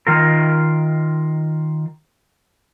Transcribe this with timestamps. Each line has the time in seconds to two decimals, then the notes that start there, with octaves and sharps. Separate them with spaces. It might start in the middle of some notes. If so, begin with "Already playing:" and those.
0.07 D#3 F4 A#4